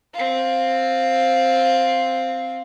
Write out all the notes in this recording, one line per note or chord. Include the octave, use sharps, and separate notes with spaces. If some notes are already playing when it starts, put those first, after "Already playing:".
C4 F4